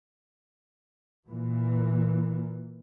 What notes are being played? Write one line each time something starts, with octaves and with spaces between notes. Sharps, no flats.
A#2 E3